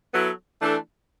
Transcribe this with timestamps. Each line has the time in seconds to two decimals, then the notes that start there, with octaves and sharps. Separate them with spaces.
0.12 F#3 B3 E4 A4
0.59 E3 A3 D4 A4